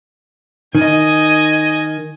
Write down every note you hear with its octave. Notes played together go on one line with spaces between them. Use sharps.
D#3 D#5 G#5